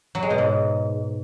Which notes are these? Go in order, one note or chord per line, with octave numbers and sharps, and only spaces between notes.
F#3
G#3
B2
G#2